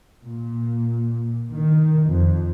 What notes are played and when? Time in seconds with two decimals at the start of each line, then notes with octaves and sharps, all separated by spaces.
0.25 A#2
1.51 D#3
2.06 F2